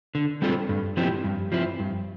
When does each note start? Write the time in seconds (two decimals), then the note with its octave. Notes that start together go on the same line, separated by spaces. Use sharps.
0.15 D3
0.42 G3 C4 F4 A4
0.69 G2
0.97 F3 C4 E4 G4
1.24 G2
1.52 F3 C4 E4
1.80 G2